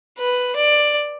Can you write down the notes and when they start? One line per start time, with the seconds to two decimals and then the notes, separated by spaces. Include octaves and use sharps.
0.18 B4
0.56 D5